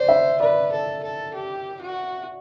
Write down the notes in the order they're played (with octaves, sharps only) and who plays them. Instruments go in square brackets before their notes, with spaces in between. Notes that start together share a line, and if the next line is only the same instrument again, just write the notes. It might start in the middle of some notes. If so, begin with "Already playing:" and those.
Already playing: [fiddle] C5 [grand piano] D5
[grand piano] E5
[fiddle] B4 [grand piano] D5
[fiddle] A4
A4
G4
F#4